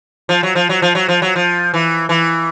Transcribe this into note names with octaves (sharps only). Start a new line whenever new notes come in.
F3
F#3
F3
F#3
F3
F#3
F3
F#3
F3
E3
E3